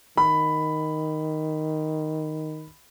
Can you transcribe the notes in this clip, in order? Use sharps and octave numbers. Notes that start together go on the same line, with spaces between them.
D#3 B5